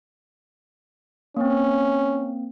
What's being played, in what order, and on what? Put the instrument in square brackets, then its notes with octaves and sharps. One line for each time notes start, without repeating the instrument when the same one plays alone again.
[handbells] A#3 C4 [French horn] C#4